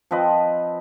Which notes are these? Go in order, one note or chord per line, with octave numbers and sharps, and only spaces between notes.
F3 C4 B4 D#5